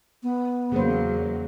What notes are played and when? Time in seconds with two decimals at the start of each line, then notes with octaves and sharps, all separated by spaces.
0.23 B3
0.72 E2 C#3 F#3 A#3 C5